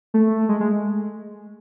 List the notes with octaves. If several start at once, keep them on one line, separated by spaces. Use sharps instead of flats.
A3
G#3
G#3